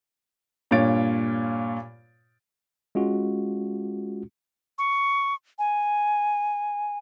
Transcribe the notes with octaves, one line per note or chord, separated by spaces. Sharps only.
G2 A#2 F4 C#5 A6 D7
G#3 C#4 F4 F#4
C#6
G#5